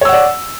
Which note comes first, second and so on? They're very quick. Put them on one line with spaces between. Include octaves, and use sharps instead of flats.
C#5 E6 F#5 D5